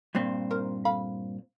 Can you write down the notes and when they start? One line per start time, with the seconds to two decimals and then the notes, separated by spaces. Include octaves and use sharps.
0.15 G2 A#2 C4
0.51 D#3 A#4 C5
0.85 A4 F5 B5